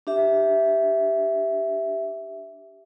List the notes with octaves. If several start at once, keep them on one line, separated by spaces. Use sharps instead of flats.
D4 G4 E5